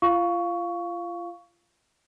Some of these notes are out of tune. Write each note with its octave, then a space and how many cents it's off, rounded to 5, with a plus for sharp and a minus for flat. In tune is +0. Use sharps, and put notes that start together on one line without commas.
F4 -30 F5 +0 C#6 +15